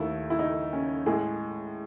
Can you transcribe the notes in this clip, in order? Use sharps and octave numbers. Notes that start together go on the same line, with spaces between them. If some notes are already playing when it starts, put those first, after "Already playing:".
Already playing: D#2 D#3 A3 E4
E4
D#4
C#4
A2 G#3 G#4